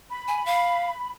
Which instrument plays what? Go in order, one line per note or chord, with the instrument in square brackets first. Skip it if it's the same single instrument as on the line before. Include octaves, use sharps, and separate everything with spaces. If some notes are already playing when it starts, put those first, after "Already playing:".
[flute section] B5
[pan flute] G#5
F5